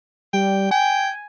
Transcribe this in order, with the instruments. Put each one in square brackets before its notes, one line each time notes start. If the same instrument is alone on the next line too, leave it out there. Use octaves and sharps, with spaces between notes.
[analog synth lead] G3 [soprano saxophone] G5
[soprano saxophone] G5 [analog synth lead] G#5